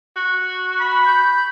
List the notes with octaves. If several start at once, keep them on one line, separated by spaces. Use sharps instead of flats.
F#4
B5
G6